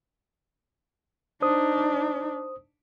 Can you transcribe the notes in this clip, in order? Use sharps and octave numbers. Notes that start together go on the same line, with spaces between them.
D4 D#4 C5 D#6